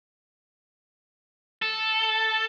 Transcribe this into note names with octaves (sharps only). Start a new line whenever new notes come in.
A4